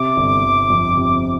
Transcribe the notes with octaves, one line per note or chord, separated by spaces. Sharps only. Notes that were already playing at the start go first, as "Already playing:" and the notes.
Already playing: C3 D6
G1
G1
F2
C3